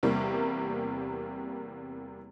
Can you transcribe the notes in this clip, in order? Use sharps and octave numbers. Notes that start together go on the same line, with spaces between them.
E2 C3 G3 A#3